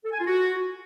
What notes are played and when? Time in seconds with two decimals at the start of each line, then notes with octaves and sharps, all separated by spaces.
0.04 A4
0.11 G#5
0.19 F4
0.26 F#4